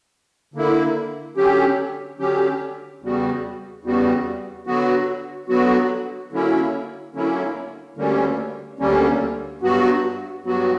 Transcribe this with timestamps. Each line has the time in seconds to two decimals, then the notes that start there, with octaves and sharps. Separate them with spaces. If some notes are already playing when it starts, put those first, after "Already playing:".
0.54 D3 A#3 E4
1.37 D3 F#3 C#4 G4
2.19 D3 F#3 C#4 G4
3.02 E2 C#3 G3 B3 F#4
3.84 E2 C#3 G3 B3 F#4
4.67 D3 F#3 B3 F#4
5.49 D3 F#3 B3 F#4
6.31 D3 F#3 A#3 C#4 E4
7.14 D3 F#3 A#3 C#4 E4
7.96 D2 D3 G3 A#3 C#4
8.79 D2 D3 G3 A#3 C#4
9.62 G2 F#3 B3 F#4
10.44 G2 F#3 B3 F#4